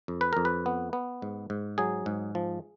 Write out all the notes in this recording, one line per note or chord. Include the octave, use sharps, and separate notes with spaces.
F2
B4
F2 A#4
B4
B3
B3
G#2
G#2
F#3 G#4
G#2
F3